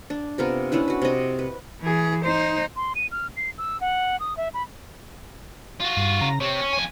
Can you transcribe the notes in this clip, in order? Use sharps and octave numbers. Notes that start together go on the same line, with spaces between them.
D4
C3 B3 F4 A#4
C#4 D4 E4 B4
F#4 B4
C3 D#5
B4
E3 G#4
D#4 C5
C6
D#7
F6
C7
E6
F#5
D#6
E5
B5
F4 F#4
G2
C#3 A#5
C3 C4 C#5
C#4
F2 G#5